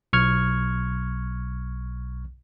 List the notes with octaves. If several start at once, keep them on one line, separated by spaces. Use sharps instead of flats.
B1 C#6 F6 G#6